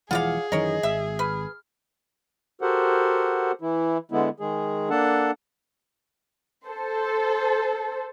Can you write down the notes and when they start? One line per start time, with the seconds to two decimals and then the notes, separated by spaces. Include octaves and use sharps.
0.11 E1 E3 F3 F4 G#4 D5 F5 F#5
0.52 F#2 D#3 E3 A#4 C#5 D#5
0.83 G#1 E5
1.19 B4 F6
2.61 F#4 G4 A4 A#4 C5 F#5
3.61 E3 E4
4.11 D3 G#3 B3 E4
4.40 D#3 G#3 G#4
4.90 A#3 D4 A4 F#5 A5
6.65 A4 C5